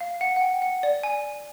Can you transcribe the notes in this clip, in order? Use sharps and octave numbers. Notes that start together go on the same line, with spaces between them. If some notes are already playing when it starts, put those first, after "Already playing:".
F5
F#5
F#5
G5
F#5
D5
G#5